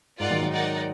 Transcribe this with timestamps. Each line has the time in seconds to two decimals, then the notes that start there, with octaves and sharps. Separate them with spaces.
0.19 G#2 F4 A#4 D5 F#5
0.30 D#3 F#3
0.41 D#3 F#3
0.52 D#4 A#4 D5 F#5